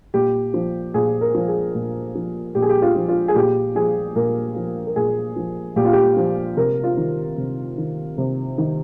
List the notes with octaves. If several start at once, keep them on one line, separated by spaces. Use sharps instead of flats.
A#2 G4
F3
A#2 G#4
A#4
F3
G#4
A#2
F3
A#2 G4
G#4
G4
F4
F3
F4
G#4
A#2 G4
F3 G#4
A#2 A#4
F3
A#4
A#2 G#4
F3
A#2 G4
F4
G4
F3
C3 A#4
F4
D#3
C3
D#3
C3
D#3